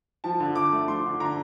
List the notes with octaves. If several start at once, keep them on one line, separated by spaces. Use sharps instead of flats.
F3 A5
D3
D3 D6
A3
F3 C6
D3
D3 A#5